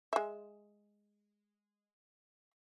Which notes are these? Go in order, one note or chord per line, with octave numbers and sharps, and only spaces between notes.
G#3 E5